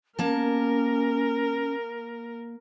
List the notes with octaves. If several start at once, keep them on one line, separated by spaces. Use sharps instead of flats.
A#3 C#4 A#4 A5